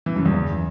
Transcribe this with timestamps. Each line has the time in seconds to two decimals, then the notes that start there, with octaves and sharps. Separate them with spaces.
0.06 E3
0.16 F#2
0.26 E2